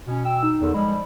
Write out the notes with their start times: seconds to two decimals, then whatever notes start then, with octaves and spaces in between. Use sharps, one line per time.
0.07 B2 C#4
0.25 G5 E6
0.43 D#4
0.60 E2 D3 D#3
0.74 F3 G3 G#3 B5